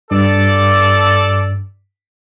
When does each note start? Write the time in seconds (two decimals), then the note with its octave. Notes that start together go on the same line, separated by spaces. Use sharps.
0.11 G2 A4 D5